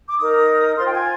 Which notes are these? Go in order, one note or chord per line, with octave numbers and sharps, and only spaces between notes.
D6
D#4 A#4 D#6
F4 C5 C6
G5
G#5